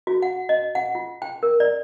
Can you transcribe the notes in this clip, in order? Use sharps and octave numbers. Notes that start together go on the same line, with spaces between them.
F#4
F#5
D#5
F#5
F4
G5
A#4
D5